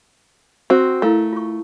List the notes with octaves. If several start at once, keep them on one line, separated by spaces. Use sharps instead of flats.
C4 F#4
A3 E4 A#4 F5
F4 C#6